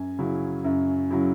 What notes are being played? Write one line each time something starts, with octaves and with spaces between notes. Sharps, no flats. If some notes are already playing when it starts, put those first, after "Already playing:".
Already playing: F#2 G#5
C#3 F#3 E4
F#2
C#3 F#3 E4